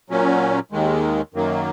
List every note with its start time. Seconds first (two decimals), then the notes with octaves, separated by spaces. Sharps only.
0.10 A#2 F#3 C#4
0.72 D#2 D#3 G#3
1.34 F#2 D#3 F#3 A#3